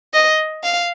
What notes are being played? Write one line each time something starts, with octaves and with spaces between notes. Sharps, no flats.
D#5
F5